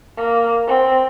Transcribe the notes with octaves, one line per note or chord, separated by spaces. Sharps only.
A#3
C4